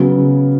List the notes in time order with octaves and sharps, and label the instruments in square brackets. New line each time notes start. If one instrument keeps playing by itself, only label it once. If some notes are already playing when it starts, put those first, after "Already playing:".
Already playing: [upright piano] C#3 F#3 B3